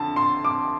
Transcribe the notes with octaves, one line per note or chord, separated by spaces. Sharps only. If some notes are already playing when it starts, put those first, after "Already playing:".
Already playing: F2 D3 A5
C6
D6